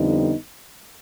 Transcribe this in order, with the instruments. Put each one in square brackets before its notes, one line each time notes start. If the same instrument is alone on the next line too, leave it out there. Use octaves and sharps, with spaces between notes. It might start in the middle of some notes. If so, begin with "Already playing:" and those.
Already playing: [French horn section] F2 D3 G3 B3 D#4